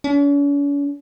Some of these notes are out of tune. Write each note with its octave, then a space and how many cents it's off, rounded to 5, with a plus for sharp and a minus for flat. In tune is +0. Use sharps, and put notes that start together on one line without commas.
C#4 +45